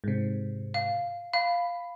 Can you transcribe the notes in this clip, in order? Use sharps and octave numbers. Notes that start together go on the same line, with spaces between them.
G#2 C3
F5
F5 B5